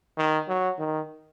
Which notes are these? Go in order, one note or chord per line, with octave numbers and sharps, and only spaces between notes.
D#3
F#3
D#3